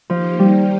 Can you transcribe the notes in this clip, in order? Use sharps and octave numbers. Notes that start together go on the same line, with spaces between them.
D#3 F3 A#3 D#4 G4
G3